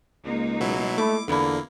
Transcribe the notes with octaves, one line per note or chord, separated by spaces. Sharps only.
C#2 G#3 A#3 D#4
B2 F#3 E4
A3 E4 D6
E2 D3 A#3 B3 E4 F4